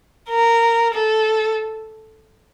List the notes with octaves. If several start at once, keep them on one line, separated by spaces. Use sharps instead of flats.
A#4
A4